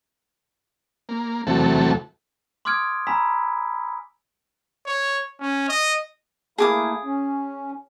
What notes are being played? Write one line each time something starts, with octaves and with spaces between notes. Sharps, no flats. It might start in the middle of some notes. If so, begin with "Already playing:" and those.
A#3
E2 C3 F#3 A3 A4
C6 D6 D#6 F6 G#6 D7
G#5 A#5 B5 E6 B6
C#5
C#4
D#5
A3 A#3 E4 G#4 D6 D#6
C#4